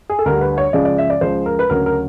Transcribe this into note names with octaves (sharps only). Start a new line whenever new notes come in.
G#4
A4
D2 D3 G3 A#4
B4
C#5
C#2 C#3 F3 G#3 D5
D5
E5
D5
C#2 C#3 F3 G#3 C5
A#4
B4
D2 C#3 F#3 A#4
A#4